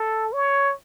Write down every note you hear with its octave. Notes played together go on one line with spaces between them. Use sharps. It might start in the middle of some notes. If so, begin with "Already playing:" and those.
Already playing: A4
C#5